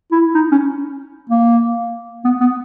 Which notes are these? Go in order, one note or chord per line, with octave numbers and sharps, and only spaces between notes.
E4
D#4
C#4
A#3
B3
B3